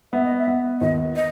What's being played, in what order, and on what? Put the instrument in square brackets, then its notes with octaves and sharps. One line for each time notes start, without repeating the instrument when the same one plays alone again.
[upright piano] B3 [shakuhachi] E5
[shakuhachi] D#5
E5
[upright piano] B3
[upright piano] D#2 [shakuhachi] D#5
[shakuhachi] D#5